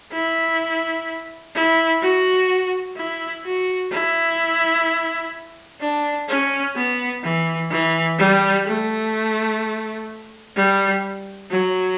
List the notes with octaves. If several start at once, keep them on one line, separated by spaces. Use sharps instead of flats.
E4
E4
F#4
E4
F#4
E4
D4
C#4
B3
E3
E3
G3
A3
G3
F#3